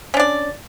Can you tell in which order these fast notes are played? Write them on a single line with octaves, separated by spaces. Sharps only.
C#4 D4 D5